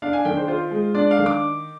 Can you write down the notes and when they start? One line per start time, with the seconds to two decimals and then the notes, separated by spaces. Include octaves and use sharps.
0.02 D4 F5
0.13 G#5
0.25 D#3 G5
0.37 C5
0.48 F4 C5
0.71 G#3
0.95 D4 D5
1.11 F5
1.19 D#3
1.26 D6